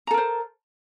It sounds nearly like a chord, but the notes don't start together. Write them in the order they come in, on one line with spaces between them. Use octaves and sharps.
A#5 A4 A#4 C5